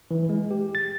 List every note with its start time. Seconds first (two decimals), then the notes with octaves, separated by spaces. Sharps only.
0.11 E3
0.29 G#3
0.51 G4
0.75 A6